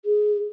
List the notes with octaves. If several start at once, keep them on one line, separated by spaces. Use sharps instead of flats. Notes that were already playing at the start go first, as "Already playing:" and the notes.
G#4